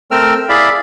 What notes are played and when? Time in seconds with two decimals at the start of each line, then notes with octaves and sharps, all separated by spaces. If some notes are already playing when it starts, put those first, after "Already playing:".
0.11 A3 C4 A#4 G5 E6 F6
0.49 E4 G#4 D5 E5 F5 B5